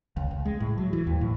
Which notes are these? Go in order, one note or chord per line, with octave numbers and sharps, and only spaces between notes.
C#2
C#2
G#3
A2
F#3
E3
D#2
A2